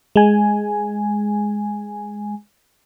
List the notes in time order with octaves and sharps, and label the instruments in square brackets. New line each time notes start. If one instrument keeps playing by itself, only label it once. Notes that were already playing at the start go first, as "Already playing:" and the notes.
[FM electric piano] G#3 G#5